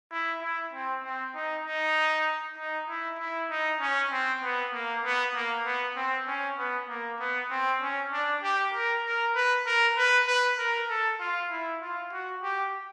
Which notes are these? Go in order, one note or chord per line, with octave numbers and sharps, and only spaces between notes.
E4
E4
C4
C4
D#4
D#4
D#4
E4
E4
D#4
C#4
C4
B3
A#3
B3
A#3
B3
C4
C#4
B3
A#3
B3
C4
C#4
D4
G4
A#4
A#4
B4
A#4
B4
B4
A#4
A4
F4
E4
F4
F#4
G4